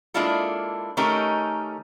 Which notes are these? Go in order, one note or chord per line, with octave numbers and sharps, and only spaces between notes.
G#3 A#3 D4 E4 F4 A4
D#3 A3 C#4 D#4 G4 A#4